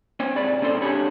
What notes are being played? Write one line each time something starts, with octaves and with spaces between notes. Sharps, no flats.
C4 C5 C#5
C2 G#2 D5 B5
A#2 C4 C#4 A4 C6
C#2 D3 G4 C#5 B5